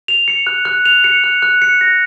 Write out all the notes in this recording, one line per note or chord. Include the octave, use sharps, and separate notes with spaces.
F7
C#7
F#6
F#6
F7
C#7
F#6
F#6
C#7
A#6